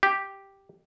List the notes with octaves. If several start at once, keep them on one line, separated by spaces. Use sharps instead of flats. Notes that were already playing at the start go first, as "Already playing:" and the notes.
G4